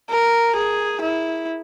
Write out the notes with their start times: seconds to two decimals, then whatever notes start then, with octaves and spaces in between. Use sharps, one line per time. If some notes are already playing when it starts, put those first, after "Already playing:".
0.11 A#4
0.56 G#4
1.01 E4